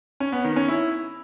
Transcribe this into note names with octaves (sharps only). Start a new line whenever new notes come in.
C#4
B3
D#3
C#4
E4